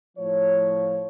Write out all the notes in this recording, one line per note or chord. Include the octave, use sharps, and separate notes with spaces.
A2 F3 C#5